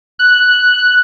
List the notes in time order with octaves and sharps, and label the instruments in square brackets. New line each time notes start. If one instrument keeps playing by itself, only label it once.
[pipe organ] F#6